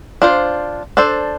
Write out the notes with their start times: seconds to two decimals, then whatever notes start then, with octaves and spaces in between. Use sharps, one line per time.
0.22 D4 F4 C5
0.97 D4 A4 C5